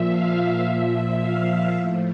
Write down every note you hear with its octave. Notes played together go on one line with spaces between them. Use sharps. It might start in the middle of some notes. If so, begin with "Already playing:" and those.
Already playing: A#2 F3 E5
F5
A#2 F3 E5
F5
A2 F3